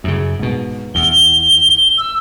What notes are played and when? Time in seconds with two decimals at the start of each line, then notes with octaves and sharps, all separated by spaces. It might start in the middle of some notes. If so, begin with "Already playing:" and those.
0.04 F#2 C#3
0.39 G#2 B2
0.95 E2 G7
1.98 E6